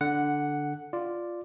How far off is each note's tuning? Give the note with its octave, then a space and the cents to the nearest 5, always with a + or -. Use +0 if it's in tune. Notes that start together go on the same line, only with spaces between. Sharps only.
D3 -5 F#5 +0
F4 -5 D5 +0